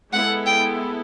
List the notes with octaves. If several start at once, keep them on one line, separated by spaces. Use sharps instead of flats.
G#3 B3 E4 A4 F#5
G5